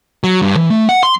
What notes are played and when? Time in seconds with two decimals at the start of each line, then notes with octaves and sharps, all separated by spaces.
0.24 F#3
0.42 G2
0.57 E3
0.71 A3
0.89 F#5
1.03 C6